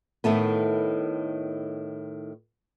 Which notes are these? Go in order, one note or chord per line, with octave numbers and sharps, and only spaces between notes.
A2 D#3 A3 B3